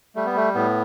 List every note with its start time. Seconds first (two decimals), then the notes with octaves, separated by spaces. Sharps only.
0.16 G3 A3
0.26 B3
0.36 A3
0.55 A2 B3